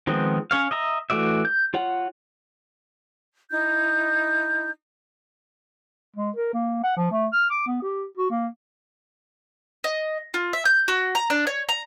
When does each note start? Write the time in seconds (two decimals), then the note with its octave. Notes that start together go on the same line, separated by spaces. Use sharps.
0.07 D#3 F3 G#3 B3 C4
0.51 C#4 C#5 F5
0.71 D#5 E5 A#5
1.10 E3 A3 F#4 D5 E5
1.45 G6
1.74 F4 C#5 F#5
3.50 D#4 E4 G6
6.16 G#3
6.36 A#4
6.54 A#3
6.83 F#5
6.97 F3
7.11 A3
7.32 F6
7.50 D6
7.67 B3
7.82 G4
8.17 F#4
8.31 A#3
9.84 D#5
10.34 F4
10.53 E5
10.65 G6
10.88 F#4
11.15 A#5
11.30 D4
11.47 C#5
11.69 A#5